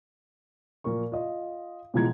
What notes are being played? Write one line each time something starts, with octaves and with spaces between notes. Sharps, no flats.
A#2 F3 A#4 C#6
F4 D#5
B2 E3 F3 G#3 A#5 G#6